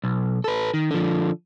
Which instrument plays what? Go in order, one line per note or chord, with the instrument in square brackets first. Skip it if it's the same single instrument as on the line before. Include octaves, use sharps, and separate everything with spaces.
[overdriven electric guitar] B1
A4 B4
D#3
D3 F3